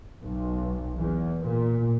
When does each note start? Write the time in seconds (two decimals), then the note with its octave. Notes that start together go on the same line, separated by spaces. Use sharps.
0.21 B1
0.98 E2
1.41 A#2